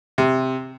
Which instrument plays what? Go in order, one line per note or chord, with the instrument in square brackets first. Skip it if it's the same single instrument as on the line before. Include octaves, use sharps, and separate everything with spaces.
[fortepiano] C3